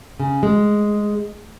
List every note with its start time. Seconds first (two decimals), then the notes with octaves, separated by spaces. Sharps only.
0.20 C#3
0.43 G#3